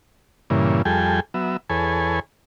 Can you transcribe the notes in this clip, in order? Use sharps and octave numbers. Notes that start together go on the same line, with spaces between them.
G2 A#2 C#3 E3
F2 G3 G#4 A4 G5 G#5
F#3 B3 E5
E2 G#4 A4 B4 C#5 G#5